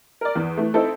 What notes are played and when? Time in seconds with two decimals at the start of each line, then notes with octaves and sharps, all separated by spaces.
0.21 A#4 D5
0.35 E2
0.57 E3 A3
0.74 C4 D#4 E4 A4